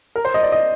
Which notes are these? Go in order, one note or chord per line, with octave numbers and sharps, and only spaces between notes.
A#4
C5
D#5
D5
D#5